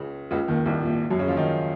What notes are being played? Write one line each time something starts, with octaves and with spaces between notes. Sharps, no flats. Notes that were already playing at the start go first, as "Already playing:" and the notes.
Already playing: C#2 C#3
C#2 C#3
D#2 D#3
C2 C3
A#2
F#2 F#3
C#3 C#4
F3 F4
D#3 D#4